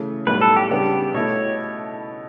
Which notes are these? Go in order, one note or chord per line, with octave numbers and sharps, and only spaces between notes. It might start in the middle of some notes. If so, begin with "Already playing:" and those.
Already playing: C#3 E3 A3
B1 A2 G3 B3 B4
A4
G4
C#3 G3 B3 D4 G4
B2 A3 E4 C#5